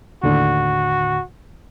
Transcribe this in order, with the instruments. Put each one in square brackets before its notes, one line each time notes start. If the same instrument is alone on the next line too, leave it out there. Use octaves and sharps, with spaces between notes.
[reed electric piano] D#2 A2 D3 [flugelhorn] F#4